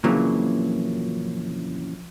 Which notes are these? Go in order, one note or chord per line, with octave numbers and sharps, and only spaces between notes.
F2 A#2 C#3 E3 F#3 A#3